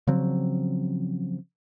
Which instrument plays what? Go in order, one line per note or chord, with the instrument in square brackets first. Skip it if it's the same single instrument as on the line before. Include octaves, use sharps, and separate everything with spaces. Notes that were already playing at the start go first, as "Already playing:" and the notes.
[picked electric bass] C#3 F3 F#3 C4